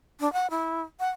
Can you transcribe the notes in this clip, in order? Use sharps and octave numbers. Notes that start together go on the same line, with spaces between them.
D4
F#5
E4
F#5